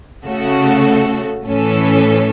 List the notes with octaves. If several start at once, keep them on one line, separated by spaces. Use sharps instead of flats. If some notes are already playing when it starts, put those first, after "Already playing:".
C#3 A3 F#4 A4
A2 E3 C#4 A4